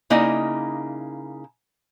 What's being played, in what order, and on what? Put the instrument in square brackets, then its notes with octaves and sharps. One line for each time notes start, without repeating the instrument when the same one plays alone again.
[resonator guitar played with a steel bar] C#3 A#3 D#4 E4 D#5